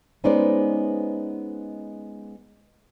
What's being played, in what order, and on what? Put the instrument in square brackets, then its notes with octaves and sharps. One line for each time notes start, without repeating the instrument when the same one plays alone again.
[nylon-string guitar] G#3 B3 C#4 D#4 C5 D5